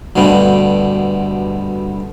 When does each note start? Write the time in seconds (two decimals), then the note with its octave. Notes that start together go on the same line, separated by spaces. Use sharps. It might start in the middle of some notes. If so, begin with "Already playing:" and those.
0.16 D2 G2 B2 D3 G3